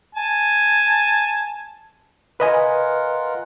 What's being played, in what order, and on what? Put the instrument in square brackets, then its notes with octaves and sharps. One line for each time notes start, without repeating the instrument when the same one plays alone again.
[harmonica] G#5 A5
[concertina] F4 A#4 F#5 [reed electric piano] B4 D#5 G#5